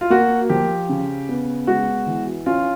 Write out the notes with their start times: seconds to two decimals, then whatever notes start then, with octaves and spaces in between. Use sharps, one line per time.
0.01 F4
0.10 A#3 F#4
0.49 F3 G4
0.89 C#3
1.29 B3
1.67 G#3 F#4
2.07 E3
2.46 C#4 F4